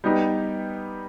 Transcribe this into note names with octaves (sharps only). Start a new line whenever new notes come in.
G3 B3 D#4 G4